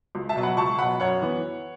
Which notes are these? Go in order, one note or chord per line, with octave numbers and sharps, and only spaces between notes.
C#2
E5 A5
B2 F#3
F#5 B5
C#2 A5 C#6
B2 F#3 F#5 B5
F#2 C#5 F#5
E3 B3